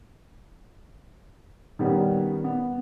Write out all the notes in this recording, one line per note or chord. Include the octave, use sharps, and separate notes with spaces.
D#3 G3 B3 C#4
B3